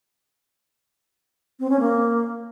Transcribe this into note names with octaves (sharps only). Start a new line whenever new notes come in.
C4
C#4
A#3